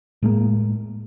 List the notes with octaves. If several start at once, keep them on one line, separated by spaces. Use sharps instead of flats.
A2 G#3 A#3